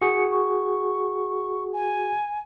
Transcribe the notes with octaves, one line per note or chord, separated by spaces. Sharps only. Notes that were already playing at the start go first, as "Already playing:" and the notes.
F#4 G#4 C#7
C#6
G#5